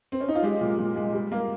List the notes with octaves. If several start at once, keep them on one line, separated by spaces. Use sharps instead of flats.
C4
C#4
D#4
F4
G#3 G4
A#2
A#2
G#3
G3
A#3